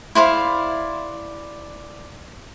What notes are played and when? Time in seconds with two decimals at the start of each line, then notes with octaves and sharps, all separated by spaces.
0.15 E4 C5 D5 F5